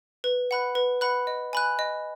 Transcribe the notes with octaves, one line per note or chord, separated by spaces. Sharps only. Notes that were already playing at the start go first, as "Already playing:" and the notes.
B4
F#5 B5 F#6
B4
F#5 B5 F#6
D#5
G#5 B5 F#6
D#5